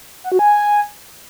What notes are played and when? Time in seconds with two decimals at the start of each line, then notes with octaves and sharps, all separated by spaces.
0.24 F#5
0.32 F#4
0.39 G#5